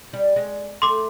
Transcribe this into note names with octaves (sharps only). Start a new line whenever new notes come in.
G3
G#3
A3 C6 D6